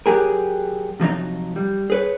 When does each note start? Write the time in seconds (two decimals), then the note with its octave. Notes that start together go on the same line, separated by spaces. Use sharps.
0.06 F#3 G4 G#4 A#4
1.00 C3 F3 F#3 D#4
1.56 G3
1.90 G#4 B4 C#5